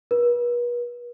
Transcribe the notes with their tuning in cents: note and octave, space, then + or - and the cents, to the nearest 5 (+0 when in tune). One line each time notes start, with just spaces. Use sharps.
B4 -40